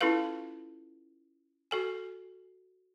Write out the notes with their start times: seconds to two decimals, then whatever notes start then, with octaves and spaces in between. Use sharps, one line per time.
0.01 C#4 E4 F4 A4 B4 F5
1.71 F#4 A4 G#5